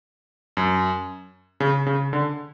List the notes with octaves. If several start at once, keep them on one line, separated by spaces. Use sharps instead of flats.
F#2
C#3
C#3
D3